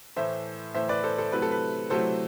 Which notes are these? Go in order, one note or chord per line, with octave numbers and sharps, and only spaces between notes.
A2 E3 A3 C5 E5
A2 E3 A3 C5 E5
B4 D5
A4 C5
A4 C5
C3 F#3 A3 C4 E4 B4
A4
B4
C3 F#3 A3 C4 E4 A4 C5